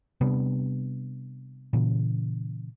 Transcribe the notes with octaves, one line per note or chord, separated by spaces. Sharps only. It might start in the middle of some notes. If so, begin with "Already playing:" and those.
C3 G3 B3 D4
A#2 C#3 E3